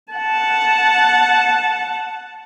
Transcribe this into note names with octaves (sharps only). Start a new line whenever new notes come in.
F#5 A5